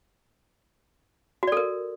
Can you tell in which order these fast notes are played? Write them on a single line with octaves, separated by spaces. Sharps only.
F#4 D5 A4 A#4